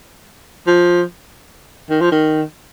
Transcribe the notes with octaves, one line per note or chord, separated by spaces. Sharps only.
F3
D#3
F3
D#3